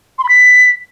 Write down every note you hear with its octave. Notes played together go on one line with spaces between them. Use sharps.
C6
B5
B6